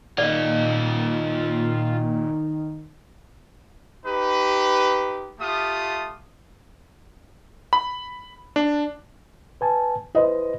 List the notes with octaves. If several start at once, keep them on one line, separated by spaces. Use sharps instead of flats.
A#2 D#3 F4 D5 D#5
D#4 G4 B4
A3 F4 G4 D#6
B5
D4
B4 G#5 A5
E4 B4 C5 D#5